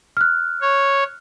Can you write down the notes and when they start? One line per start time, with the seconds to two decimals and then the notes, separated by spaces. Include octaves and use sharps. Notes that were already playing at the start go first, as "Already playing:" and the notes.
0.17 F6 F#6
0.61 C#5